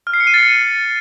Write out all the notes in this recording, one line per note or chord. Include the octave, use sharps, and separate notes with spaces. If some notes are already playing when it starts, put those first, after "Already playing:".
F6
C7
C#7
D#7
A6